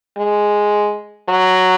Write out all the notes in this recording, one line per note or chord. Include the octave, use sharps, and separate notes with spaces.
G#3
F#3